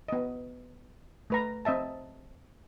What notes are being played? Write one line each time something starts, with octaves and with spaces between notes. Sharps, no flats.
B3 D#5
A3 B4 A#5
C4 D#5 E5 A5